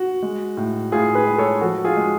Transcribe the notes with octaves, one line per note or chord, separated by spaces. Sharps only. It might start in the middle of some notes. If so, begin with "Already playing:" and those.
Already playing: F#4
G#3
A2
A2 F4 G#4
G#4 B4
G#3
A4 C#5
F3 F#4 A4
F4 G#4
G#3